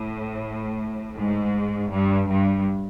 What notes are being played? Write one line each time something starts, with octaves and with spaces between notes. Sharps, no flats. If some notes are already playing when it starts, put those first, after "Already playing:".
Already playing: A2
G#2
G2
G2